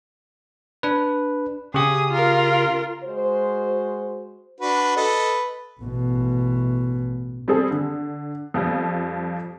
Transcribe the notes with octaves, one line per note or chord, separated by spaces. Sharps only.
D4 B4
C#3 G4 G#4 D#6
F4 A#4
G#3 F#4 C5
D4 F#4 B4
A4 B4 D#5
A1 B2
G3 C4 G#4 A4
D3
F2 F3 G3